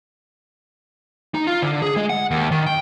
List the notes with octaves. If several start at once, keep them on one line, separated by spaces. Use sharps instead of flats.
D#4
F4
D3
G#4
G#3
F#5
D#2
D#3
G5